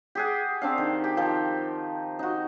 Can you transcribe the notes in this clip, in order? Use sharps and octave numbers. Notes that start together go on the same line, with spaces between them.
G4 G#4 F#5
C4 D4 F5
D#3
G4
D#3 F3 G4
D#4 F#4